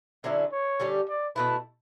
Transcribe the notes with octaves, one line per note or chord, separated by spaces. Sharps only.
D3 F#3 C#4 E4 E5
C#5
D3 G3 C#4 G4
D5
B2 A3 E4 B4